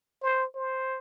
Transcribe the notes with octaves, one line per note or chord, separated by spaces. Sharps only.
C5
C5